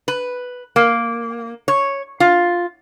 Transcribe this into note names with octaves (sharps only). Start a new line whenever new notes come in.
B4
A#3
C#5
F4